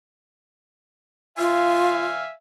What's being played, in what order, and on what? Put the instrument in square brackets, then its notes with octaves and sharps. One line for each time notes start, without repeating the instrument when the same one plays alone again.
[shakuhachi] F4 [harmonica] E5 F5 G#5